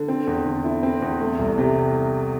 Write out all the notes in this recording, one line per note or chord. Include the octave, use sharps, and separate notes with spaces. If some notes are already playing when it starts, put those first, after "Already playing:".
Already playing: D3
C4
E2
D3
E4
C4
E2
A3
C2
C3